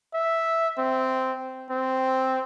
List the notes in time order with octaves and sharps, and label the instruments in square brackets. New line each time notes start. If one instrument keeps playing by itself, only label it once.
[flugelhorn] E5
C4
C4